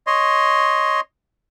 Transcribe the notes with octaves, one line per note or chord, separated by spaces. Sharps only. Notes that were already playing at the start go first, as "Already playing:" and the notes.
C#5 D#5 C6